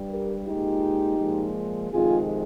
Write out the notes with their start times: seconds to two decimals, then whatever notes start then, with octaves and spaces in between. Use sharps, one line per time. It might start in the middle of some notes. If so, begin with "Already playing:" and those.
Already playing: G2 G3
0.10 G4 A#4
0.46 A#2 G#3 D#4 G4
1.19 A#2 F3 G#3
1.92 F2 C3 D#3 G#3 F4 G#4